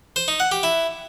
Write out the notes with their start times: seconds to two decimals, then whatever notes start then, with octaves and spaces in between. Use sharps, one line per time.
0.16 C5
0.28 D#4
0.40 F#5
0.52 G4
0.63 E4